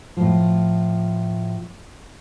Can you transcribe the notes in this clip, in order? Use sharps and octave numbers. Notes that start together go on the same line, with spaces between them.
A2 F3